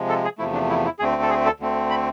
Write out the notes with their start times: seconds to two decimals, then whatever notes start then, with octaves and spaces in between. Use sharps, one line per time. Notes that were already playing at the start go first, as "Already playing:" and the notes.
Already playing: C3 F3 G#3
0.09 A4
0.24 G#4
0.38 E2 C3 F3 A3 E4
0.54 D4
0.70 E4
0.85 E4
0.99 D2 D3 A3 C4 G#4
1.22 A4
1.29 G#4
1.46 A4
1.60 D2 D3 A3 C4
1.90 B5